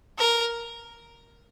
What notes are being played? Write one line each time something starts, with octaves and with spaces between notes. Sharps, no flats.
A#4